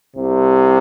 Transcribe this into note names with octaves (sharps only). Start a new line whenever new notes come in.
C2 C3